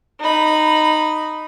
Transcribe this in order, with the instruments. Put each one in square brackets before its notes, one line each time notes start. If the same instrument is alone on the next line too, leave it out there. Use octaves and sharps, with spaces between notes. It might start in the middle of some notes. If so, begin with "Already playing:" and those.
[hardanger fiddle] D#4 B5